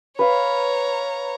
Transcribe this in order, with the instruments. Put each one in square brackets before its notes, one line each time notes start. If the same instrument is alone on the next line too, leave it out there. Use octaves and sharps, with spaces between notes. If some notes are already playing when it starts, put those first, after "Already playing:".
[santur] B4 F5 [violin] C#5 A#5